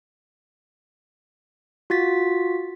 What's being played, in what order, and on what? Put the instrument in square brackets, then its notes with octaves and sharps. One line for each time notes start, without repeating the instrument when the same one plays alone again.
[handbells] F4 F#4 A6 B6